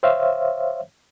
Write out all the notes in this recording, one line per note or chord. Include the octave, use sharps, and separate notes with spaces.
C5 C#5 E5 F5